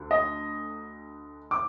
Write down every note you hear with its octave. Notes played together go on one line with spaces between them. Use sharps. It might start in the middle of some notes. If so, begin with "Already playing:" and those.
Already playing: D2 D3
D#5
D6